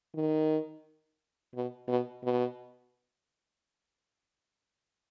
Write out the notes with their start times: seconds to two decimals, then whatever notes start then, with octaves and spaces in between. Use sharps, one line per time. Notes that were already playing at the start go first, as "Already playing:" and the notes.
0.15 D#3
1.55 B2
1.88 B2
2.24 B2